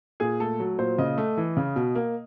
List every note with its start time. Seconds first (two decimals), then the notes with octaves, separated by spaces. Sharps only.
0.20 A#2 G#4
0.40 A3 A4
0.60 F#3
0.79 A#2 C5
0.98 C#3 D#5
1.18 A3
1.37 E3
1.57 C#3
1.76 B2
1.95 A#3